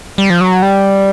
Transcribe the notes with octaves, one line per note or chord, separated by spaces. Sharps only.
G3
F3
F#3
G3